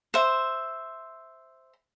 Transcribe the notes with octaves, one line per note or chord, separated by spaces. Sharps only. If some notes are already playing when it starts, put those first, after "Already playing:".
C5 E5